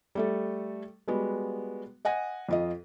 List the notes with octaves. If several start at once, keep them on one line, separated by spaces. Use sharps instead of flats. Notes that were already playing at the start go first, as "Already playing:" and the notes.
G3 A3 A4
G3 G#3 B3 F#4
D#5 F#5 G#5 A#6 D#7
F2 F4 D#5